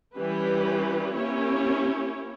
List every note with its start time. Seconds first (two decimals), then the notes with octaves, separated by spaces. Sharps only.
0.16 E3 G3 C#4 G4 B4
1.16 A#3 C#4 E4 G4 C#5